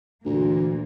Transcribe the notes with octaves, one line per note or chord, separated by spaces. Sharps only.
D2 A#2 E3 A#3